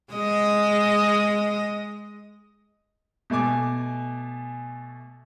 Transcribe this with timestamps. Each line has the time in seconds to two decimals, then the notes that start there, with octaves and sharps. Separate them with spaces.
0.13 G#3 D#5
3.30 B2 A3 G#5 D6